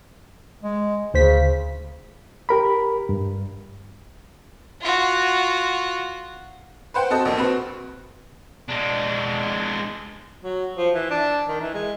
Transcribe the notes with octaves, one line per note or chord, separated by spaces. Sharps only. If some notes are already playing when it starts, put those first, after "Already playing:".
G#3
D2 C#3 C5 B6
G4 A#4 B5
G2
F4 F#4
B4 C5 F#5 G5
C4 F#4 A4 D#5
A#1 A#2
C4 F#4 B4
G#3 D4
F#3
F3
E3
D4
D#3
E3
G#3